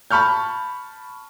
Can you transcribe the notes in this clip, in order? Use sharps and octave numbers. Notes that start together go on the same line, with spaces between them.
A5 B5 C#6 F6 G6